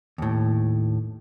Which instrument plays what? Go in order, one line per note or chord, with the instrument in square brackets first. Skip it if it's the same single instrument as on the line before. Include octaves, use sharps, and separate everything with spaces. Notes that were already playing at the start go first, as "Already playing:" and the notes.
[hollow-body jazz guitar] D#2 A2